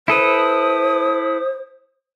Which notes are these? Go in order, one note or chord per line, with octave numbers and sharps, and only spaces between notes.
E4 A4 B4 C5 D#6